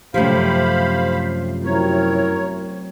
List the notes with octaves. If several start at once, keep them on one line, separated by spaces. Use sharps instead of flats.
F#2 C3 F3 A3 G4 C5 F5 B5
F#3 C4 E4 A#4 C#5